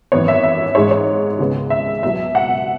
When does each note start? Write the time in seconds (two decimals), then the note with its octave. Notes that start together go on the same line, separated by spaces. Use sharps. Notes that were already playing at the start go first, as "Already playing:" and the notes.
0.12 G#1 F#2 E3 B3 C#5
0.28 E5
0.43 E5
0.75 G#2 G#3 C#4 C#5
0.91 C#5
1.38 C#2 C#3 G#3 B3
1.70 E5
2.03 C#2 B2 F#3 E5
2.35 F#5